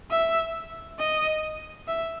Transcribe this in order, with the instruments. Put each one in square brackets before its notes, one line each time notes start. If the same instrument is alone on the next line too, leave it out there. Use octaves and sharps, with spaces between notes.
[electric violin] E5
D#5
E5